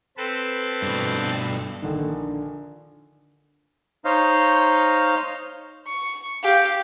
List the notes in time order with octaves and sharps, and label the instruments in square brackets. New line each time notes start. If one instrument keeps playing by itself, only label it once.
[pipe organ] C4 A4 B4
[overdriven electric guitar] G2 B2
[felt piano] A#1 D3 D#3
[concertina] D#4 C5 C#5 D#5 F5
[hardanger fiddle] C#6
G4 F5